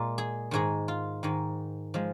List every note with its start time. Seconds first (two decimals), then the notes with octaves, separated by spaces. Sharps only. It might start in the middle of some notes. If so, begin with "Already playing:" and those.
Already playing: A#2 G#3 F4
0.18 G#4
0.51 G#2 D#3 G#3 G#4
0.88 F4
1.23 G#2 D#3 G#3
1.94 F3 G#3